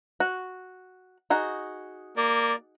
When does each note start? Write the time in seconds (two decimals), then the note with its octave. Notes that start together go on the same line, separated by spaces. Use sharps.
0.20 F#4
1.30 D#4 F#4 G#4
2.17 A#3 D5